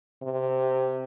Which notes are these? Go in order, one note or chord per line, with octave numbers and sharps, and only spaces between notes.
C3